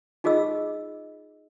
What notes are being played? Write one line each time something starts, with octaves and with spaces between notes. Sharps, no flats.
D#4 F4 G#4 D#5 E6